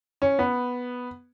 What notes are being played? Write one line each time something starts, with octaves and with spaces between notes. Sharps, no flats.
C#4
B3